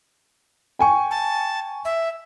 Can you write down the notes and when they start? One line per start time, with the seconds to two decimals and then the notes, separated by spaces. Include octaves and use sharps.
0.79 G5 G#5 C#6
1.11 A5
1.85 E5